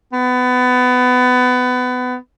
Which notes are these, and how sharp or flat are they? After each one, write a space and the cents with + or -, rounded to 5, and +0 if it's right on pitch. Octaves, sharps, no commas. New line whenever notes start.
B3 +25